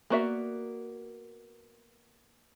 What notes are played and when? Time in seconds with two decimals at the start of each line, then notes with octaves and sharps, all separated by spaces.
0.10 A#3 B3 F#4 D5 E5